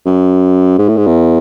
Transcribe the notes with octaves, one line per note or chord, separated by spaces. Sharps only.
F#2
G#2
A2
G#2
E2